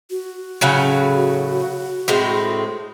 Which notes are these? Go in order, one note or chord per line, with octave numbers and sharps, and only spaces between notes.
F#4
A2 C#3 F#3
A2 G#3 C4